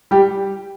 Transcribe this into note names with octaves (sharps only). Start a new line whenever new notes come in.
G3 G4